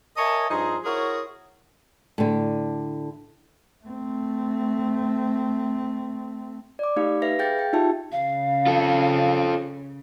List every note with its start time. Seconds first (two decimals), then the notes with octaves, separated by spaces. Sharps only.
0.17 A#4 C#5 D#5 E5 G#5 A5
0.49 G2 F3 D#4 G#4 A#5 C6
0.84 E4 F#4 G#4 A#4 C5 C#5
2.18 A2 D3
3.85 A3 C4
6.79 D5 D6
6.96 A3 D#4 G4 F5
7.22 B4 E5 F5 A#6
7.39 G#4 F5 G5 G6 A6
7.59 G5
7.73 D#4 F4 G4 E5 A5
8.12 C#3 F5
8.67 F4 A4